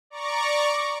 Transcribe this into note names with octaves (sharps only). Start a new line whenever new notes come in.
D5 A#5 C#6 D6